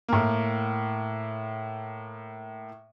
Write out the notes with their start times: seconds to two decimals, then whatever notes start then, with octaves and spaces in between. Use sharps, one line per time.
0.08 A2 A#3